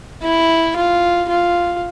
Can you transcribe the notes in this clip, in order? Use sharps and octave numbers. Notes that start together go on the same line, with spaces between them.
E4
F4
F4